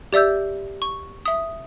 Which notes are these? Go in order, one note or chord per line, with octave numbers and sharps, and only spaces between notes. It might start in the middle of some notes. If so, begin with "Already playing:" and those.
G4 D5 E5 E6 G6
C#6
E5 D#6